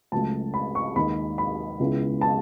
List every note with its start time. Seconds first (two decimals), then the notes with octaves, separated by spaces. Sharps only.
0.12 C#2 C#3 F#3 A3 A5
0.54 B5
0.75 C#6
0.96 D#2 D#3 G#3 D#4 B5
1.38 B5
1.80 C#2 C#3 G#3 B3 E4
2.21 A5